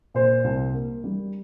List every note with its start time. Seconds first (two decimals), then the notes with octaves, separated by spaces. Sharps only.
0.14 A#2 C5
0.44 C2
0.74 A#3
1.04 G3